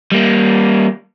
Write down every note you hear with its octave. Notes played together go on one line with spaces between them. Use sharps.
G3 A#3